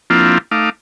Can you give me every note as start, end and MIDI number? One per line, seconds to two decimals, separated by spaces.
0.10 0.38 53
0.10 0.38 58
0.10 0.38 60
0.10 0.38 62
0.10 0.38 64
0.10 0.38 65
0.51 0.70 57
0.51 0.70 63
0.51 0.70 77
0.51 0.70 86